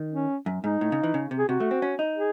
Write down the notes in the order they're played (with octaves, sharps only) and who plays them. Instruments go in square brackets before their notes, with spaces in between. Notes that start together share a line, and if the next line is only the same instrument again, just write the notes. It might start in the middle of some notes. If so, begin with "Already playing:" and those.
Already playing: [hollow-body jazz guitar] D#3
[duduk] C#4
[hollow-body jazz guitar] F#2
[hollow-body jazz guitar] G#2 [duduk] D#4
[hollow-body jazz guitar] A2
C#3
E3
C#3
C3
[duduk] G#4
[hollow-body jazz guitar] C3 [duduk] F#4
[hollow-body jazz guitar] A3
C4
C#4
D#4
[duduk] G#4